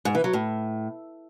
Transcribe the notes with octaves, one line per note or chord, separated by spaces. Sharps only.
G#2
E3
F#3
A2